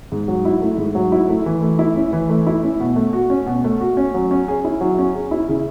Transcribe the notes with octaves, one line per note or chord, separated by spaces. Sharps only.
G#2
F#3
E4
A3
G#2
F#3
E4
A3
E3
A3
E4
C#4
E3
A3
E4
C#4
B2
A3
F#4
C#4
B2
A3
F#4
C#4
F#3
C#4
G#4
E4
F#3
C#4
G#4
E4
C#3